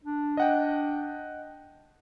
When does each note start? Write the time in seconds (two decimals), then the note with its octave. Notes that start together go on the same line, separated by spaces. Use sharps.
0.04 D4
0.37 D#5 F#5 G5